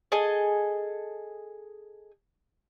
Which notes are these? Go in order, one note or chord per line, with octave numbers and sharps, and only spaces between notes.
G#4 A4 D#5